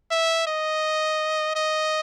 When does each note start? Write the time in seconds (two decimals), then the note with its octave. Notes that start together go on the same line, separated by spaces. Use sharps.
0.11 E5
0.47 D#5
1.56 D#5